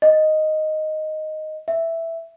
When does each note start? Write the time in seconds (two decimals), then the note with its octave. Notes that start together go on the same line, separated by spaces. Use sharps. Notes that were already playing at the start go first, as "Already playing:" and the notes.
0.02 D#5
1.68 E5